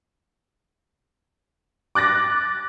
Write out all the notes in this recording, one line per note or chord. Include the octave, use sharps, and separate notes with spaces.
D6 F#6 A6 A#6